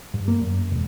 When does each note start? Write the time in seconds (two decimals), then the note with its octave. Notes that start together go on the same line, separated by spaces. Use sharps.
0.14 G2
0.28 A#3
0.41 F#2
0.72 E1